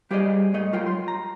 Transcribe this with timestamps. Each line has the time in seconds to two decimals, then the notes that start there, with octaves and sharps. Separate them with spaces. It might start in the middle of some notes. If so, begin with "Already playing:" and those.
0.11 G3 G4 G#4 C5 D5 D#5
0.54 G#2 A3 D#5
0.73 F#3 F4 A#4 G5
0.86 C6
1.08 A#5